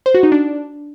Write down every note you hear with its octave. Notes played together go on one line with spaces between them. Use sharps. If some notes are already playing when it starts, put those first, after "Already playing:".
C5
F#4
D#4
D4